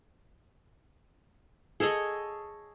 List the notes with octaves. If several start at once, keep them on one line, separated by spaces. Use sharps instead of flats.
G#4 A4 C#5 D#5